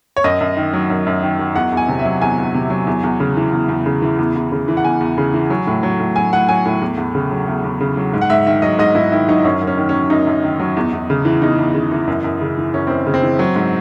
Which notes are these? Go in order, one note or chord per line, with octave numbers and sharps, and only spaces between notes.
C#5
F#2 D#5
F#2
D#3
F#3
F#2
F#2
D#3
F#3
E2 F#5
E2
G#5
C3
E5
F#3
E2 G#5
E2
C3
F#3
E2
E2
C#3
E3
E2
E2
C#3
E3
E2
E2
C#3
E3
F#5
E2 G#5
E2
C#3
E3
F#3
A2
F#3
A2
F#3 G#5
A2 F#5
F#3 G#5
A2
E2
E2
C#3
F#3
E2
E2
C#3
F#3
G#2
F#5
G#2 E5
D#3 E5
F#3 D#5
G#2 D#5
G#2 E4
D#3 E4
F#3 D#4
F#2 C#4
F#2
C#4
D#3
F#3 C#4
F#2 D#4
F#2
D#3
F#3
E2
E2
C#3
E3
E2 D#4
E2
C#3
E3
F#2
F#2
C#3
E3
F#2 C#4
F#2 C4
C#3
C4
E3
F#3
G#2